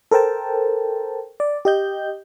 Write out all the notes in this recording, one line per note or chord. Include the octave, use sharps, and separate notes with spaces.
A4 A#4 C5 G5 A5
D5
G4 D#5 G6